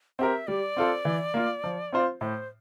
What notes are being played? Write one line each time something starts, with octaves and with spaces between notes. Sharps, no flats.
C4 G4 A#4 E5
G3 D5
C4 F4 A4 C5
E3
A#3 F4
F3
C4 F4 C5
A2 C5